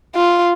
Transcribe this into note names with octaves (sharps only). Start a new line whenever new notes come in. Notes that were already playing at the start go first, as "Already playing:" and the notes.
F4